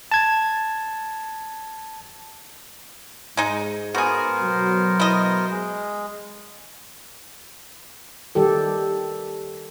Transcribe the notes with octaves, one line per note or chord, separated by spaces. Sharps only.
A5 G#6
G#2 G#3 D#4
B3 F#4 G#4 A#4 C5
B2 F#3
E4 D#5
G#3
D#3 G3 G4 A4